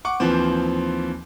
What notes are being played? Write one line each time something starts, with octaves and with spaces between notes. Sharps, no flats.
F#5 C#6 D6
D#2 E3 F3 C4